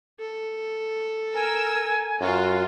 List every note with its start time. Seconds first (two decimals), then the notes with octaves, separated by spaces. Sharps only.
0.20 A4
1.35 A#4 G#5 E6
2.21 F#2 F4 F#4